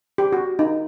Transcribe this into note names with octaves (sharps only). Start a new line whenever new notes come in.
G4
F#4
D#4